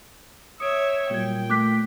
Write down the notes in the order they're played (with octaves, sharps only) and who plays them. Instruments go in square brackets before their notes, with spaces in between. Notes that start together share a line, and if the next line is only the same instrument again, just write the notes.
[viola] C#5 E5 [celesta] D#6 [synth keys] C#7 D7
[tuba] A#2 [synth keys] F#3 G3 G#6 [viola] G5
[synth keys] A3 [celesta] D6 F#6 B6